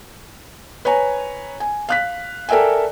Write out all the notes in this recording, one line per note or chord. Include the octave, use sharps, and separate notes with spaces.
B4 C#5 G#5 A#5
G#5
F5 F#6 B6
A4 A#4 D5 E5 G5 G#5